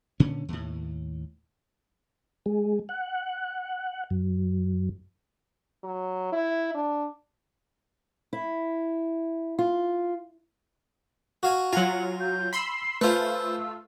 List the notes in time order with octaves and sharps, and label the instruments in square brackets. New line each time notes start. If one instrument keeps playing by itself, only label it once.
[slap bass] A#2 D3 C#4
D#2 A2
[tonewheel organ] G#3
F#5
F#2
[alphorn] F#3
E4
D4
[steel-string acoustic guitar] E4
F4
[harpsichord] F#4 F5 G#5
[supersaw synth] F#3 F4 [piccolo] F#5 [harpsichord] G#5 A#5
[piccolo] G6
[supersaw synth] B5 C6 E6 [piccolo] C7
[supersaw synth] A3 F4 [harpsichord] B4 C5 G#5 [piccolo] E6